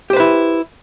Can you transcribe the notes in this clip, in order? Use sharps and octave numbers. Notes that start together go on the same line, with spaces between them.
E4 G4 B4 C5